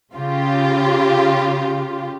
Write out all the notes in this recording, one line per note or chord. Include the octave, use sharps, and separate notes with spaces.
C#3 F4 G4